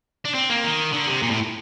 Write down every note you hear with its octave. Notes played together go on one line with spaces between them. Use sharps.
D4
C4
A#3
D#3
D3
C3
A#2
A2